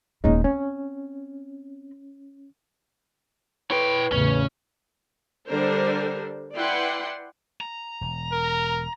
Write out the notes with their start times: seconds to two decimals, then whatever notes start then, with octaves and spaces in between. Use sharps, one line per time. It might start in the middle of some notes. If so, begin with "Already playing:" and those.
0.24 D#1 G#3 A#3 C#4 D#4
0.44 C4 C#4
3.71 E4 B4 C#5 G5
4.12 A1 E2 C#3 C#4
5.48 D3 G3 D4 A4 A#4 C5
6.57 E4 B4 D5 F#5 G5 C6
7.61 A#5
8.01 E1
8.32 A#4